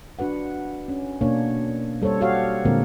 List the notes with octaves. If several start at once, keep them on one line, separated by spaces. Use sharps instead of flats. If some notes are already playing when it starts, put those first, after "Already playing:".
D4 F#4 B4 F#5
C#4
B2 A#3 D4 C#5
G3 A4 C5 C#5
F#4 G4 C#5 F5 F#5
A#2 D3 G#3 A#3 C4 A#4